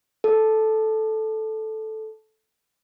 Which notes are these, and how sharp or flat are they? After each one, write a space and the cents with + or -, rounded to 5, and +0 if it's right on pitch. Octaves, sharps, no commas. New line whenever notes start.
A4 -5